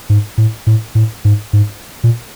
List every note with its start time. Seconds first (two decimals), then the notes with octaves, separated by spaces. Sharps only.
0.10 G#2
0.38 A2
0.67 A2
0.95 A2
1.25 G#2
1.53 G#2
2.04 A#2